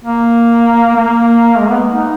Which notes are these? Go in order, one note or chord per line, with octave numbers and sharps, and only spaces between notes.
A#3
A#3
G#3
B3
D#4